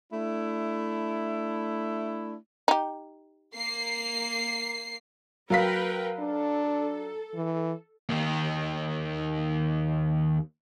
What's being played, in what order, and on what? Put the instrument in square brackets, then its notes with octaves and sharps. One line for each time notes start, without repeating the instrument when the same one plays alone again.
[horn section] A3 D4 E4
[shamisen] D#4 G4
[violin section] A#3 C7
[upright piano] F#3 F5 B6 [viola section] A#4 B4 G5
[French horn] D4 [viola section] A4
[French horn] E3
[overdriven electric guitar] D#2 D#3